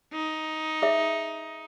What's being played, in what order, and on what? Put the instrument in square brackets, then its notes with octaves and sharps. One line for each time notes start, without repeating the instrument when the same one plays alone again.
[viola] D#4
[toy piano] G#4 E5